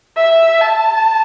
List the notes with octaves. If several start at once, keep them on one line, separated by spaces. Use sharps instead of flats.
E5
A5